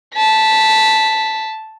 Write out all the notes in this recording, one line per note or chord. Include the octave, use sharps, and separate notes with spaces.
A5 B6